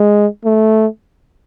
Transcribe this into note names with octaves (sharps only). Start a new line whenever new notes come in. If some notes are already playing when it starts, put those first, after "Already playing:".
Already playing: G#3
A3